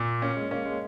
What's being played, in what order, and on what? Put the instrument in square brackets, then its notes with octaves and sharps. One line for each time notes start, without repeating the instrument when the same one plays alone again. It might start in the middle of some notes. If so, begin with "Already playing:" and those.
Already playing: [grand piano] A#2
[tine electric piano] A#3 [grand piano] C#4
[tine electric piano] G#3
[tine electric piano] A#3 [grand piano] C#4
[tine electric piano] G#3